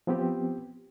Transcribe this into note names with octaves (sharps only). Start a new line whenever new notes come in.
F3 B3 C4 G4